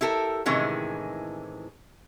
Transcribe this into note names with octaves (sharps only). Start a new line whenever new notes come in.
E4 G4 A4 A#4
A2 C3 D#3 E3 G#3 C#4